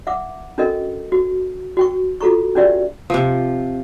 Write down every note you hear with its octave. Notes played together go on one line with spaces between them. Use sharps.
E5 F#5 D6
C#4 D4 F#4 A4 A#4 D#5
F#4
F#4 G5 C#6
F4 F#4 A4 A#5 C#6
C#4 D4 F#4 G4 D5 E5
C3 F3